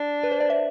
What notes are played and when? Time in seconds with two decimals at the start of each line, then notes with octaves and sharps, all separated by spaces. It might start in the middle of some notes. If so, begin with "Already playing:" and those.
Already playing: D4
0.23 B4
0.32 C5
0.40 D5
0.50 E5